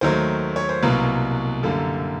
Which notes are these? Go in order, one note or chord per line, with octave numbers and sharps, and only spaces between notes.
D#2 D#3 F#3 A3 C5
C#5
C5
C2 B2 F#3 A#3 B4
F#2 D3 G3 A#3 A4